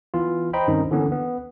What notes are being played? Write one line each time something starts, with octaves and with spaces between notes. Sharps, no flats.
E3 B3 F4
C5 D#5 G5 A#5 B5
G2 D#3 C4 C#4 D#4
D3 E3 A#3 B3 C#4
B3